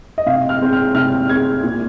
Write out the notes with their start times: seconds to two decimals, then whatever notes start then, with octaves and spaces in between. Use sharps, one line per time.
0.18 D#5
0.26 C3 F5
0.49 F6
0.61 G#3 C4
0.73 F6
0.95 C3 F6
1.29 G#3 C4 G#6
1.63 A#2